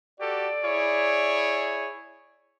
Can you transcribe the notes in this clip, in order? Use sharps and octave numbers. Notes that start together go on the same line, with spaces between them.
F#4 G4 A4 D5
E4 G#4 C#5